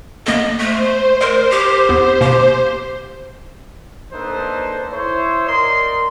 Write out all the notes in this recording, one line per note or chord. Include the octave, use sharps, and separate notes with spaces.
A#3 B3 A4 D#5
A3 C5
A#4 D5 D#5 C6
G4
E2 B3 C4
B2 A#3 G4
A#3 D4 D#4 A4 B4 C5
E4 C5 C#5
A#4 D5 D#5 C6